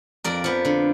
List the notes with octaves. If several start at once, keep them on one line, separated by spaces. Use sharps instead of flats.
F2 A#4 D5
F3 B3
D3